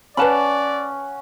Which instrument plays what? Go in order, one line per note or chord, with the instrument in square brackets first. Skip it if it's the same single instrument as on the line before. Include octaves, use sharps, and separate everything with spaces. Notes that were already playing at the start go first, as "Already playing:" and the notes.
[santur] C#4 F#5 [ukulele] B4 A5 B5 [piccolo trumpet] D5